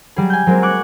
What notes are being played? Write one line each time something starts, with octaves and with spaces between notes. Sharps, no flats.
F#3 G3 G#4
G#5 G6
F#3 G#3 A#3 C4
C#6 D6 F#6 G#6